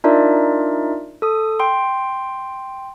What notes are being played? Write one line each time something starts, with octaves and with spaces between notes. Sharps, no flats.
D4 D#4 F4 A#4 D5 E5
A4 D#6
G5 C6